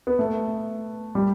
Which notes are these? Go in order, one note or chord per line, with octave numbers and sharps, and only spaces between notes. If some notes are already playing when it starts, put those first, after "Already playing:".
B3
A3
G3